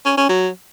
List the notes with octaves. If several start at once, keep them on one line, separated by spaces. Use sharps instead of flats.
C#4
C#4
F#3